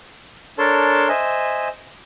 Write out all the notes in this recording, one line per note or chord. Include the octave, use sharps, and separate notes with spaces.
D4 A4 A#4 C#5 A5 C6
C5 D#5 E5 G#5